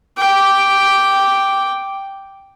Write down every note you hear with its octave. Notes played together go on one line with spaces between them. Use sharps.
G5 D6